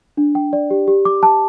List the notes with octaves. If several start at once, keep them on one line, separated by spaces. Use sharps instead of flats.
D4
G5
D5
G4
G4
D6
A5